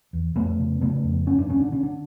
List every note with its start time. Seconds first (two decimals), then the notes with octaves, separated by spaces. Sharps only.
0.13 E2
0.35 F2 A3 B3
0.59 C#3
0.81 C#3 A3 B3
1.04 F2
1.26 G2 C#4
1.38 D4
1.49 D3 C#4
1.60 D4
1.72 D3 C#4
1.83 D4